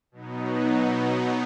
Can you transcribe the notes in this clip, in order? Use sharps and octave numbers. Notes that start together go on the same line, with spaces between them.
B2 F#3 B3 D#4